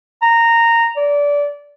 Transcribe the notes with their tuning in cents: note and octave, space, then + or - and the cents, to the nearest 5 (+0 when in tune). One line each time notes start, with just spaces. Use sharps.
A#5 -10
D5 -20